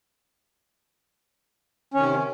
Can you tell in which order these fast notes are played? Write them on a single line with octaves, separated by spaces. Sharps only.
C#4 D#3 C3